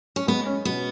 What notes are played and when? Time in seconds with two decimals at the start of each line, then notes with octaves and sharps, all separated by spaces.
0.16 C#4
0.27 G#3 B3
0.46 C#4
0.65 B2 B3